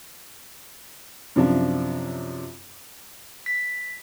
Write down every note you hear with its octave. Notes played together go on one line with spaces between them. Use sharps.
F#2 C3 F3 D4
B6